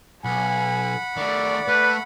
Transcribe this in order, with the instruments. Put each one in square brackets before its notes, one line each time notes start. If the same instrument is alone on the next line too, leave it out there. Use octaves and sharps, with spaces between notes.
[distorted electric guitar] B1 [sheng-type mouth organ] F#5 B5 [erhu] G#5
[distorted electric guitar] D#3 A3 [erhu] D5
[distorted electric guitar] A3 [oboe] B4